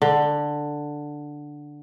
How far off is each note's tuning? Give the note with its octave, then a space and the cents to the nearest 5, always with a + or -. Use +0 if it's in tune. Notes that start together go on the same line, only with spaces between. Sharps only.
D3 +5